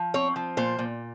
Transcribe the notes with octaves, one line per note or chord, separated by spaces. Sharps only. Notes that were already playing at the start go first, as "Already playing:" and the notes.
Already playing: F3
C4 C#5
F3
A#2 C5
A#2